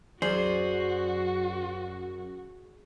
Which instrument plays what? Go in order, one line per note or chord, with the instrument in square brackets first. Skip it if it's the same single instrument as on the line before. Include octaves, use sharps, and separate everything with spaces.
[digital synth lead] F#2 [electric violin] F#4 [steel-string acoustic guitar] G#4 [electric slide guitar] C5 D5